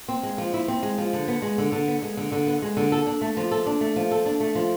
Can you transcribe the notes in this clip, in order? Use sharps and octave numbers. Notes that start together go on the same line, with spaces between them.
C4
G#3
F3
E4
C4
G#3
F3
D3
B3
G#3
D3
D3
B3
G#3
D3
D3
B3
G#3
D3
A4
D4
A3
F3
A4
D4
A3
F3
A4
D4
A3
F3